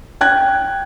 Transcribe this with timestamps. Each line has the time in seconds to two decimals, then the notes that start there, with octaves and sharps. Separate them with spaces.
0.21 G5 F#6 G#6